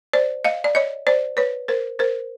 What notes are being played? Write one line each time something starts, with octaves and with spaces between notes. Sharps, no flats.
C5 D5
D#5 F5
D5
C#5 D#5
C5 D5
B4 C#5
A#4 C5
A#4 C5